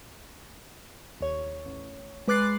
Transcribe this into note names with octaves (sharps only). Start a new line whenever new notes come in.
D#2 C#5
A1
G#3 B4 D6 F#6 A6 C7